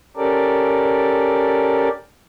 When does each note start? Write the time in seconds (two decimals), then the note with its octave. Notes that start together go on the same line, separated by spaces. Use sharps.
0.17 C#4 G4 A4 A#4 D5